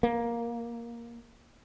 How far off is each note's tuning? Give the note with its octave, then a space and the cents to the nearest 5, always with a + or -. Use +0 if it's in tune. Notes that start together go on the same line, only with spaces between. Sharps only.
A#3 +10